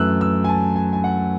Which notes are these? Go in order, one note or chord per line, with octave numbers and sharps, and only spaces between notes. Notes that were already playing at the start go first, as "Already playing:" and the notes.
Already playing: F#2 E3 A3 E6 F#6
E6
G#5
A5
G#5
G#5
F#5